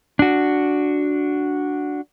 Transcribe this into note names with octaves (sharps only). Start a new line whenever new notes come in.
D4 F#4